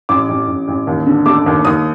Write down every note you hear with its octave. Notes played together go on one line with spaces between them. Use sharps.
A1 D6
A1
A1
A1
D#2
D3
A3 D6
D#2
D#2 D#6